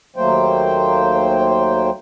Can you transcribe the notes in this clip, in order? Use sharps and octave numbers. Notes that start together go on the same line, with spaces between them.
D#2 F#3 A3 A#3 C5 G5